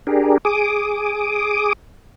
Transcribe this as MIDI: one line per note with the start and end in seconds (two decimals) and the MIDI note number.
0.07 0.38 62
0.07 0.38 67
0.07 0.38 68
0.07 0.38 70
0.45 1.73 68
0.45 1.73 86
0.45 1.73 87